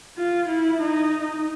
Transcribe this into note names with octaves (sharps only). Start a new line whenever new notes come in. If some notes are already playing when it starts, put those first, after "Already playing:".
F4
E4
D#4